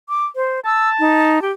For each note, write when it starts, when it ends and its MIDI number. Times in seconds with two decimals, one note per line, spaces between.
0.09 0.26 86
0.36 0.60 72
0.65 1.42 81
0.65 0.89 88
0.99 1.42 63
1.42 1.51 67